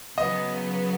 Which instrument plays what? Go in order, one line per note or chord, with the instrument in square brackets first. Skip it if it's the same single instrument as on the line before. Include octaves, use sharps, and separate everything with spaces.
[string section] C#3 F#3 B3 [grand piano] D#5